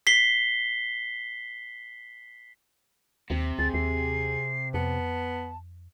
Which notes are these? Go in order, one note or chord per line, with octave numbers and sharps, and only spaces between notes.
B6 C7 G7
D#2 C3
D2 G#4 A6
D#2 C7
F2 B3 A5